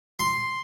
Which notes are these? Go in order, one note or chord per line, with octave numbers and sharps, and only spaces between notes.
C6